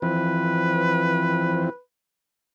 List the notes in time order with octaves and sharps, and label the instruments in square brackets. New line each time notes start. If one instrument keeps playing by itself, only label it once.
[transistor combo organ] E3 F3 C4 [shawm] B4